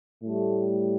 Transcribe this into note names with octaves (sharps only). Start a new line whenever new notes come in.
A2 G3 A3